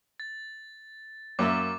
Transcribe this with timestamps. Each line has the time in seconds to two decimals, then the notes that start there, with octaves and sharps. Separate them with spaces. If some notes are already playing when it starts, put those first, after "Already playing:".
0.20 A6
1.39 F#2 A#3 E5 D6